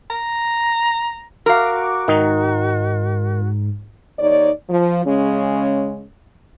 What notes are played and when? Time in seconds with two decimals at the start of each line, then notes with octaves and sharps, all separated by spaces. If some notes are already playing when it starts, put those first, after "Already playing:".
0.10 A#5
1.46 F#4 A#4 F5 D6
2.08 G#2 D#3 D#4
4.19 D#2 D#4 C#5 D5
4.69 F3
5.05 C#3 G#3 C#4